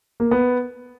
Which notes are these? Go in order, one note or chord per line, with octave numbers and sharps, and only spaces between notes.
A#3
B3